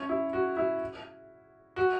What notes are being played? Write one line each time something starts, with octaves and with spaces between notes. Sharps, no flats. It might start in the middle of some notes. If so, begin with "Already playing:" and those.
Already playing: C#4
E4
F#4
E4
F#4